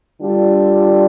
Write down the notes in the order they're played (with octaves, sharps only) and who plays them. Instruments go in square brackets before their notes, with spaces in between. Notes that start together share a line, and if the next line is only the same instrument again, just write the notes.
[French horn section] D3 G3 D4 F4